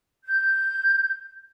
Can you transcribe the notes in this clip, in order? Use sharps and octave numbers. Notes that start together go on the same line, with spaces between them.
G6